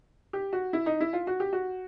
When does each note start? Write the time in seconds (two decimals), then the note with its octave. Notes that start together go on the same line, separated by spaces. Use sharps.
0.33 G4
0.53 F#4
0.73 E4
0.86 D#4
1.00 E4
1.13 F4
1.27 F#4
1.40 G4
1.53 F#4